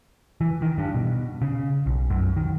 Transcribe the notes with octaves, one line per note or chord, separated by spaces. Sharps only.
E3
D#3
G2
B2
C#3
B1
F#2
D#3